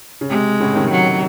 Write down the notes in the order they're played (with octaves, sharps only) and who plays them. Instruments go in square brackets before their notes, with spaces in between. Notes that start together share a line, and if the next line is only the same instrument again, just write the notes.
[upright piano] C#3
[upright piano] C3 [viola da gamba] G#3
[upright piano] A2 C#3
C3 D#3
[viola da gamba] F#3